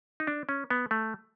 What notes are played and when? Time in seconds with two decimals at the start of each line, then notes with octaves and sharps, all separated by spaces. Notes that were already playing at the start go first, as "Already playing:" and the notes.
0.20 D#4
0.27 D4
0.49 C#4
0.70 B3
0.91 A3